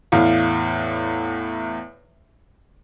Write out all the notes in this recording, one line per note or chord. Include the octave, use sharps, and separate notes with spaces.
E2 A2 F5